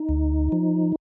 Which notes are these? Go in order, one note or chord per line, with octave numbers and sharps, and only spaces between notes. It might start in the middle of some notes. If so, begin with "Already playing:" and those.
Already playing: D#4
D2
F3